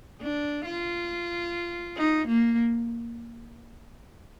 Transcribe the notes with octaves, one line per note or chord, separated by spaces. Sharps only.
D4
F4
D#4
A#3